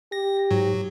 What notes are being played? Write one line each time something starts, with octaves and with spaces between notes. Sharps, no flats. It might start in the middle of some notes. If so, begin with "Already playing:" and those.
G4 A#6
G#2 F#3